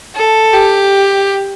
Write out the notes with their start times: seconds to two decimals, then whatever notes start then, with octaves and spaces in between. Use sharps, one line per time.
0.15 A4
0.53 G4